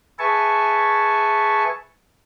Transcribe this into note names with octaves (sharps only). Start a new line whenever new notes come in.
G#4 B4 E5 G#5 A5 C#6